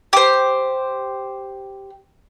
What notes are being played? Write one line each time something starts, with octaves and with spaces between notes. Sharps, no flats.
G4 C5